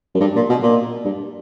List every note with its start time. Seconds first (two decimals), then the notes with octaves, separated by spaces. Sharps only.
0.14 F#2
0.20 G2
0.35 A#2
0.49 B2
0.63 A#2
1.05 G2